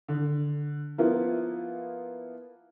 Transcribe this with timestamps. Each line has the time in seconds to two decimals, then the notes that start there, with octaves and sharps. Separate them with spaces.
0.08 D3
0.98 F3 A#3 B3 E4 F4